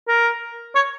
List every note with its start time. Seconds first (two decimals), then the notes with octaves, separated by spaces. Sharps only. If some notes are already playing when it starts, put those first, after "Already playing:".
0.08 A#4
0.75 C#5